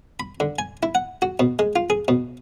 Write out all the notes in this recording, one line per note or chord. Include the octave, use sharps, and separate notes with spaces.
B5
D3
G#5
E4
F#5
F#4
B2
G#3
F4
G#4
B2